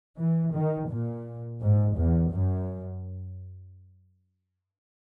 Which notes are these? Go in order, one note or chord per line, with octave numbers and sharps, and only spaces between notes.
E3
D#3
A#2
G#2
E2
F#2